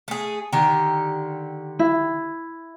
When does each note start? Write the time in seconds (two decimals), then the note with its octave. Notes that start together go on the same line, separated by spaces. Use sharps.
0.08 A3 G#4
0.52 D3 D#3 G4
1.79 E4